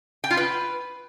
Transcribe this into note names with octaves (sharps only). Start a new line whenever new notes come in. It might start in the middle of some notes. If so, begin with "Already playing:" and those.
G5
F4
B4